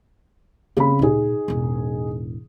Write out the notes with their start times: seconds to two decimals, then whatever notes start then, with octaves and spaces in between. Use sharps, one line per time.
0.77 C#3 A#3 C4 B5
0.99 D2 A#2 D#4 G#4
1.48 E1 A1